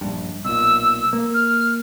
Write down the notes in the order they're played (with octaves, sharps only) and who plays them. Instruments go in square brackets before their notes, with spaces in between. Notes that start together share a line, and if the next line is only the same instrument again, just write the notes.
[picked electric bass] A#1 G2
[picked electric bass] B1 A#2 [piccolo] E6
[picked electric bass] A#3
[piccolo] F6